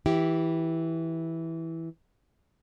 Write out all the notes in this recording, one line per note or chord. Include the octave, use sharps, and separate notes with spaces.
E3 E4 G4